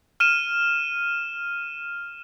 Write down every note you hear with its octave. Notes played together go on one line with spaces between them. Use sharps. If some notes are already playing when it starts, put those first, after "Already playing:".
F6 D#7 E7